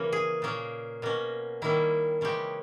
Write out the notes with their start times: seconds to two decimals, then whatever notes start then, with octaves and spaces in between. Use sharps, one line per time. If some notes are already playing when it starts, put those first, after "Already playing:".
Already playing: C#3 E3 A#3 C#4
0.12 G#4
0.42 A#2 A#3 C#4
1.02 B2 A#3 C#4
1.62 D#3 G3 A#3 C#4 E4
2.21 C#3 E3 G#3 C#4 G4